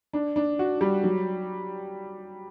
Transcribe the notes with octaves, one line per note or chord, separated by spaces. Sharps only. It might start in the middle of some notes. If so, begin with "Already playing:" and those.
D4
D4
F#4
G3
F#3